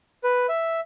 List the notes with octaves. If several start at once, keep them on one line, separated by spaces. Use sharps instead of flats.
B4
E5